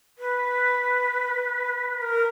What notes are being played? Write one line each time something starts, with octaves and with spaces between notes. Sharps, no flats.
B4
A#4